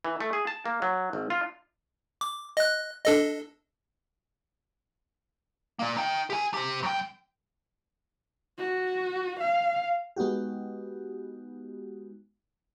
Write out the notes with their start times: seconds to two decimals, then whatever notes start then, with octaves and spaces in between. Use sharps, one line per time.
0.05 E3
0.20 A3
0.33 G#4
0.47 A5
0.66 A#3
0.82 F#3
1.13 G#1
1.30 F4
2.21 D6
2.57 D#5 F#6
3.05 D4 A4 D#5
5.79 A#3 D5
5.96 D#4 G5
6.30 G4 G#5
6.54 G4 C5
6.83 F#2 G5
8.58 F#4
9.40 F5
10.16 G#3 B3 D#4 F#4 G4